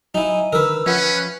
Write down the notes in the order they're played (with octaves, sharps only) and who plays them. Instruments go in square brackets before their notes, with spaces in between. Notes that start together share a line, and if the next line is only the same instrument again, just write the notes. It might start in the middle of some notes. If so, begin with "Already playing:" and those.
[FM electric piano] F#3 [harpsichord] D#4 E4 [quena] G#5
[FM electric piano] D3 D#3 [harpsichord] A#4 B4 [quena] E6
[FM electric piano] F3 F4 F#5 [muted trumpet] C#4 [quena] B4 [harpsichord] E5